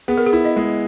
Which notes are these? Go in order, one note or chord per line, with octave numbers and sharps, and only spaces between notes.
B3 G#4
A#4
G#4
E4
D#5
G#3